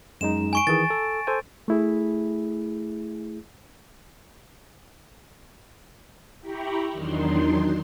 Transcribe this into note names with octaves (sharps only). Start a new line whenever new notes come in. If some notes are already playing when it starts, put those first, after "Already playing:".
F#2 G#3 D#4 E7
G#5 C#6 D7
D#3 E3 G#4 A6
A4
A4 C5 G#5
A3 E4 G#4
E4 G4 G5 A#5 B5 C#6
E2 D#3 F#3 D4 D#4 C6